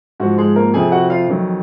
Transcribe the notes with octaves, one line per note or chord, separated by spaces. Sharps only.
G#2 F3 F#4
G#3 G#4
A#3 A#4
F2 C3 F3 G#4 G#5
F#4 F#5
F4 F5
F2 D#3 F#3